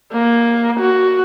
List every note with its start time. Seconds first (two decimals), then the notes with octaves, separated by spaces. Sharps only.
0.13 A#3
0.80 F#4